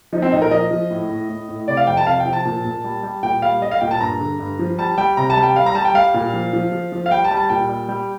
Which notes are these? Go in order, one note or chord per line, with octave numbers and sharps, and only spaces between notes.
F3 D#4
C4
A#2 D#4
A#4
F3 D#5
F3
A2
A2
A2
A2
C3 D5
F5
F2 G5
A5
C3 F5
G5
F3
A5
A#2
A#2
G3
G3
A#2 G5
G3 F5
G3 D#5
F5
A#2 G5
A5
G2 A#5
D3
G2
F3
G3 A5
G3 G5
C3 A#5
A5
G3
G5
G3 F5
A#5
G3 A5
G5
G3 F5
A#2
F3
F3
F3
F3
F5
G3 G5
A5
G3
A5
A#2 G5
G3
G3